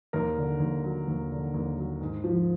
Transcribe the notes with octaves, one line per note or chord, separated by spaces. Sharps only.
D#2 A#4
D3
D#2
F#3
D#2
D3
D#2
F#3
G#2
F3